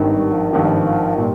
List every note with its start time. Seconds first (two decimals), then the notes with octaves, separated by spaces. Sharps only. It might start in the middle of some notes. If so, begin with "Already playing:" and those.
Already playing: G#1 G2 D#3
0.10 G3
0.32 F3
0.53 G#1 G2 D#3 F3
1.18 A#2 G3